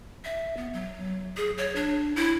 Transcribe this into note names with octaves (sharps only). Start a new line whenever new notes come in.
E5
B3
F#3
G#4
C#5
D4
E4